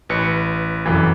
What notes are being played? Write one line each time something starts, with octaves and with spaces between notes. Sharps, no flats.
A1 B4 C#7
F1 F#2 E3